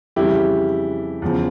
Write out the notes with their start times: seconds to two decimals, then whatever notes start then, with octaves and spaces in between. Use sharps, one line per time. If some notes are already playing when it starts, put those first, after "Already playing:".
0.16 F2 C#3 E3 G3 E4 G4
1.22 E2 C#3 F3